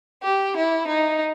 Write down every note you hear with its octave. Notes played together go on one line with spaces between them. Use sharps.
G4
E4
D#4